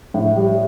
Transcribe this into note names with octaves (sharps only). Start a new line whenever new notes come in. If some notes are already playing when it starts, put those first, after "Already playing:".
A2
G3